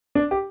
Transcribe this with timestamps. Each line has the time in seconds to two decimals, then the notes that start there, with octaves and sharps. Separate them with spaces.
0.15 D4
0.31 G4